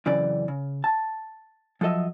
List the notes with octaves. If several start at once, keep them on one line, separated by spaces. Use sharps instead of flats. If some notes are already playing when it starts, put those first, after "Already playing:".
F#2 C#3 E3 C4 D5
C#3
A5
F3 F#3 A4 D#5 E5